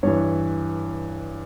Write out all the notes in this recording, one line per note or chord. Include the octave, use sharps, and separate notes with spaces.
G2 E3 C#5